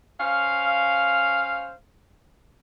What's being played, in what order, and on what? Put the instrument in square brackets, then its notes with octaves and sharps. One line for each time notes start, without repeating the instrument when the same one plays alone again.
[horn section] C#4 C5 F5